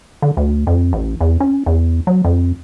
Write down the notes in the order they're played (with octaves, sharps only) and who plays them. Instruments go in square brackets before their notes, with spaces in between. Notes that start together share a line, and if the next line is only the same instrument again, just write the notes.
[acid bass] D3
D2
F2
A1
E2
C#4
E2
F#3
F2